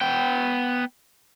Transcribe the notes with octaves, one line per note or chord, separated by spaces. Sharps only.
B3 G5